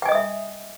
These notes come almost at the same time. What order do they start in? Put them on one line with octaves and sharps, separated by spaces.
G5 G#5 D#5 D#6 E5